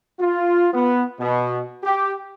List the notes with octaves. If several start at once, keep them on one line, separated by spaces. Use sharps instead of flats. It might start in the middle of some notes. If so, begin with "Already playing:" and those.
F4
B3
B2
G4